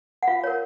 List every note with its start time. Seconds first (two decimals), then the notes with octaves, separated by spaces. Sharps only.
0.23 F#5
0.28 F4 F5
0.43 A#4 C#5